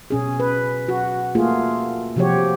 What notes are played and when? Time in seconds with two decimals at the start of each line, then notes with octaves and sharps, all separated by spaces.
0.10 B2 C#4 G#4
0.40 B4
0.89 F#4
1.35 A3 A#3 F4 G#4
2.16 C3 F3 F#4 G4 C#5